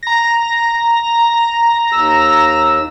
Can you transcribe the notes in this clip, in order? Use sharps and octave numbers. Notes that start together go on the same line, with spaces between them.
A#5 A#6
D#2 E6